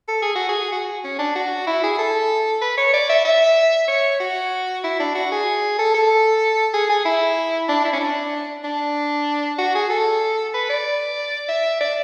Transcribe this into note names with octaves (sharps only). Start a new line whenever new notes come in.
A4
G#4
F#4
G#4
F#4
C#4
D4
F#4
E4
G#4
A4
B4
C#5
D5
E5
E5
C#5
F#4
E4
D4
F#4
G#4
A4
A4
G#4
G#4
E4
D4
E4
C#4
D4
D4
F#4
G#4
A4
B4
D5
E5
D5